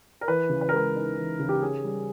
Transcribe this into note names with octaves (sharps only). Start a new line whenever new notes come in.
A#4
E3 B4
C#3
B4
A#4
G#3 B4
D#4
E3
C#3
G4
C#4 G#4
G3